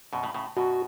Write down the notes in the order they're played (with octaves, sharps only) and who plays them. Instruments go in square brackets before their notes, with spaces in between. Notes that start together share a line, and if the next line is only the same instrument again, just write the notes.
[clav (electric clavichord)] F#2 B2
A2 C#3
A2 C#3
[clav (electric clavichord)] F#2 B2 [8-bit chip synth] F#4